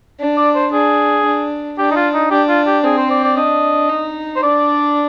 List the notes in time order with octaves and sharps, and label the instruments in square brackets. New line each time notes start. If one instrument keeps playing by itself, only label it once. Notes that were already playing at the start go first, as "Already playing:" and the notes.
[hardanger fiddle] D4
[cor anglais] D5
C5
[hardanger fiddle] D4 [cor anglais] G#4
[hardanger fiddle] D4
[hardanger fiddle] D4 [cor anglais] G4
[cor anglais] D#4
F4
D#4
[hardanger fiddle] D4 [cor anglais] G4
[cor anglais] F4
G4
[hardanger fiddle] C4 [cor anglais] G#4
[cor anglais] C5
D5
D5
[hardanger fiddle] D4 [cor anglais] D#5
[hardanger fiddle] D#4
[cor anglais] C5
[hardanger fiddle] D4 [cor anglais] D5